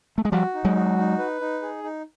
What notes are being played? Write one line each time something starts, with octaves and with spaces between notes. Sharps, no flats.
A3
G#3
F3 G3 F#4
D#4
F#3 G#3
F#4
D#4
B4
D#4
G#4
D#4